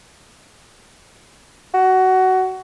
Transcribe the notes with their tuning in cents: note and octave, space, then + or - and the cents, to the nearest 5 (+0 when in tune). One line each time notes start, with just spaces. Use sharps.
F#4 +20